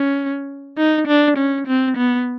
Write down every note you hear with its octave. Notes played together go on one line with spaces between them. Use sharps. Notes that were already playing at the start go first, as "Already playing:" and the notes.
Already playing: C#4
D#4
D4
C#4
C4
B3